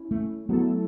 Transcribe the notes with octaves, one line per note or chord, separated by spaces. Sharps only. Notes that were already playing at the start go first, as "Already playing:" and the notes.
Already playing: C#4 E4
A3
F#3 A3 B3 E4 A4